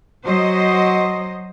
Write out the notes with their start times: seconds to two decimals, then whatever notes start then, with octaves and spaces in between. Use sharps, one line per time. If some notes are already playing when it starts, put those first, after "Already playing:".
0.24 F#3 C5 D#5